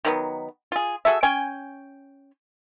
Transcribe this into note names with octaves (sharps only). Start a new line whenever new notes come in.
D#3 F#3 B3
F4 G#4
F#4 G#4 A4 E5
C#4 G5 G#5